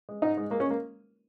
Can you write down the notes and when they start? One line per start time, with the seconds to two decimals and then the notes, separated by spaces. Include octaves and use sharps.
0.09 G#3
0.22 G#2 D#4
0.37 G#3
0.51 G#3 A#3
0.60 C#4
0.70 A#3